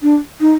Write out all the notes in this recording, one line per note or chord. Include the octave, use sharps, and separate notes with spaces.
D4
D#4